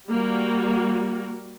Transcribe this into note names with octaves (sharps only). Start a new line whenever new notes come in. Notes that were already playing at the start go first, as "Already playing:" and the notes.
G3 A#3 F#4